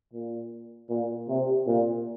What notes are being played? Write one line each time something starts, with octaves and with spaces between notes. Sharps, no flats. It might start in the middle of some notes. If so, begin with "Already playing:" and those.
A#2
A#2
C3
A#2